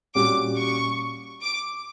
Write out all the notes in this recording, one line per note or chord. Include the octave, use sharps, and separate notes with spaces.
A#2 G3 C#4 F#4 D6
C#6
D6